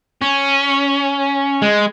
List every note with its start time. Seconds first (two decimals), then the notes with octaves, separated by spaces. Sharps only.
0.21 C#4
1.62 G#3